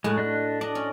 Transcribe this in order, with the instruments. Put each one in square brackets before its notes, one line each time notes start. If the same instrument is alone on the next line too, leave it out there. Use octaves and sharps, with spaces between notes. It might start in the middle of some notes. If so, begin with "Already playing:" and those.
[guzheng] A2 F#4 [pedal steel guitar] G#3
[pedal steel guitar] D4 D#5 F#6
[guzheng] D4 [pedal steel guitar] D5 D#5
[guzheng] C#4